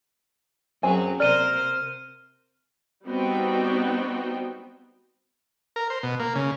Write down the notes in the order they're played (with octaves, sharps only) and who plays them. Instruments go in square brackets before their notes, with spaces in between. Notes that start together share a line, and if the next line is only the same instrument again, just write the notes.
[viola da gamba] F#2 F#3 G#4 [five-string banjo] C4 C5 G#5
[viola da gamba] C3 A#4 C5 [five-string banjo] A#3 D5 [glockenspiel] F6 D#7 G7
[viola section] G3 B3 C4 D#4 F#4 G5
[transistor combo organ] A#4
C5
B2
A#3
C#3